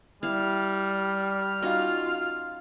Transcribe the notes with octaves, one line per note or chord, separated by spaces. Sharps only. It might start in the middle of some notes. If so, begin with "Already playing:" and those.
G3 E4 F5 F6
C#4 D#4 F4 F#4 F5